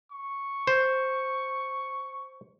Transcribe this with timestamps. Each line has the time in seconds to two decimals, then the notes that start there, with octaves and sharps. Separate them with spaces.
0.12 C#6
0.67 C5